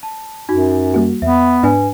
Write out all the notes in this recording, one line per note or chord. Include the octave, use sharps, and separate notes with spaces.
A5
F#2 D#4 F#4
G3 A#3 F#4
E2 B3 E5
G#2 D4 B4 G#5